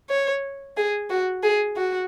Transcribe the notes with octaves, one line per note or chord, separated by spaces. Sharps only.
C#5
G#4
F#4
G#4
F#4